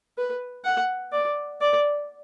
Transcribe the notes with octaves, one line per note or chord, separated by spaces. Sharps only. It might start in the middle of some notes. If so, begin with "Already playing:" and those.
B4
F#5
D5
D5